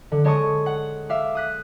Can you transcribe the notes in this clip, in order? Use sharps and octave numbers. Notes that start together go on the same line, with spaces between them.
D3
G#3 C#5 A5 C#6 D#6
F#5
E5 F5 D6
D#6 F#6 B6